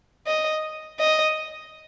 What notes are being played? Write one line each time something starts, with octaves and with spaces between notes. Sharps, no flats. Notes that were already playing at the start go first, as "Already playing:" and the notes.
D#5
D#5